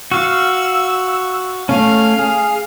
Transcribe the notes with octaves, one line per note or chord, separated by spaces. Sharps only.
F#4 F5 E6
A3 C#4 F5
G#4